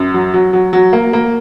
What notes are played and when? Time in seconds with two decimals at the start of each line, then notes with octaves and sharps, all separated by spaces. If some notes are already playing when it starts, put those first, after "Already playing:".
Already playing: F#2
0.14 F#3
0.34 F#3
0.53 F#3
0.73 F#3
0.93 A#3
1.13 A#3